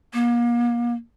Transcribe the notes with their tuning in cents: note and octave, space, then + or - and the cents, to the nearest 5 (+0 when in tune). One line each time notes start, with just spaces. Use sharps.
A#3 +35